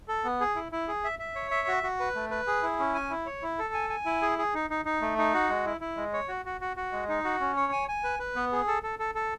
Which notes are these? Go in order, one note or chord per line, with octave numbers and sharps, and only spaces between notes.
A4
B3
G#4
E4
E4
G#4
E5
E5
C#5
E5
F#4
F#4
B4
A3
B4
G#4
E4
C#4
G#5
E4
C#5
E4
A4
G#5
G#5
E4
G#4
G#4
D#4
D#4
D#4
A3
D#4
F#4
G#3
E4
E4
G#3
C#5
F#4
F#4
F#4
F#4
G#3
D#4
F#4
C#4
C#5
G#5
G#5
B4
B4
B3
G#4
A4
A4
A4
A4